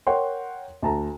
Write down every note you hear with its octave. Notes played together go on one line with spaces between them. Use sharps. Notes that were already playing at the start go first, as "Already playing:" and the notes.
A#4 C#5 F#5 G5 C6
D2 A5 A#5